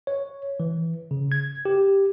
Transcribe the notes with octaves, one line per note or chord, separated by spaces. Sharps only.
C#5
E3
C#3
G#6
G4